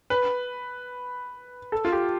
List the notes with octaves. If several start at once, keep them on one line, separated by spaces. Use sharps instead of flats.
B4
A4
F4
G4